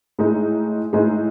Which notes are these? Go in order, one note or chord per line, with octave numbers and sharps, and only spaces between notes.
A2 G#3 D#4 G#4
A2 G#3 D#4 G#4